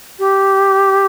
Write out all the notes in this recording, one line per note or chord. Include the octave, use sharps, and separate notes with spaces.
G4